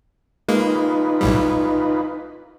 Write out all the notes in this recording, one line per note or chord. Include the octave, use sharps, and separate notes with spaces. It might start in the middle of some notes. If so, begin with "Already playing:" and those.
G#3 A#3 D#4 F4 B4
B1 A2 G3